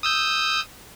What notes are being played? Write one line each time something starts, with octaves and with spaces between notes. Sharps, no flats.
D#6 E6 G6